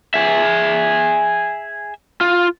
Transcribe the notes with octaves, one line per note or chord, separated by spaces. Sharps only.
G#4 E5
F4